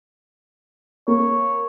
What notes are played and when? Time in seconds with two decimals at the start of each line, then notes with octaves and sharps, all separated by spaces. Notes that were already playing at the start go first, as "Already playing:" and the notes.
1.08 A#3 C#5